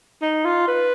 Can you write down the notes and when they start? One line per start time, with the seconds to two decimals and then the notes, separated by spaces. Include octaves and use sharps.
0.22 D#4
0.45 F4
0.68 B4